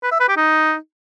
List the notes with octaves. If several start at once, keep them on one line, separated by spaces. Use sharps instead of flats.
B4
E5
B4
G4
D#4